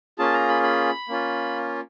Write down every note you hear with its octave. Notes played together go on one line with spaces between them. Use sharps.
A#3 C#4 F4 G#4 A5
A#5
B5
B5
A#3 C#4 F4